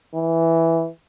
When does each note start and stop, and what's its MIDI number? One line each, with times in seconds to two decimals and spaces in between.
0.15 0.88 52